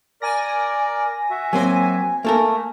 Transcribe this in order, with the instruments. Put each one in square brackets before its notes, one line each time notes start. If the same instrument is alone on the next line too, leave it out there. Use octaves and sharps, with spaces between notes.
[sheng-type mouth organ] A#4 D5 [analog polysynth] G#5 A#6
[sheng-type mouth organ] F#4 E5
[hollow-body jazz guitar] F#3 A#3 C4 [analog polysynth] G#5
[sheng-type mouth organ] A3 [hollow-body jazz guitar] A#3 A4 A#4